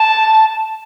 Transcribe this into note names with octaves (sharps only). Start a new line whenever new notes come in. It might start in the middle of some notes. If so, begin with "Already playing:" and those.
Already playing: A5